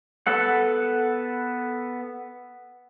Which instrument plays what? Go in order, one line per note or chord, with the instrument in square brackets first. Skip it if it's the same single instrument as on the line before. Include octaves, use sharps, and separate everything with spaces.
[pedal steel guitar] B3 A4 B4 F#5